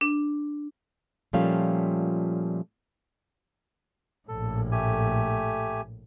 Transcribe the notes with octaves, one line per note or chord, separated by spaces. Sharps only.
D4
A#2 F3 G3 A3 C#4 F5
A#1 A2 A4
A3 G4 G#5